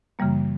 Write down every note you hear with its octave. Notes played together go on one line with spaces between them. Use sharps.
F#2 C#3 E3 G3 A#3